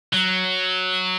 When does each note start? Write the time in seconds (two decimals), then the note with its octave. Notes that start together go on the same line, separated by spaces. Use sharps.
0.13 F#3